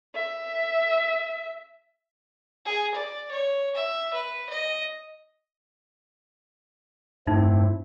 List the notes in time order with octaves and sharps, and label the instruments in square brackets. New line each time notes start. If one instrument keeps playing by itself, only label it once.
[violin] E5
[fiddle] G#4
D5
C#5
E5
B4
D#5
[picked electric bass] G2 A3 A#3 [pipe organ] C4 E4 [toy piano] D#4